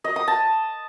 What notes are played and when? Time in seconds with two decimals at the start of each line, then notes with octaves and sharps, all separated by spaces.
0.04 D#5
0.16 D#6
0.28 A5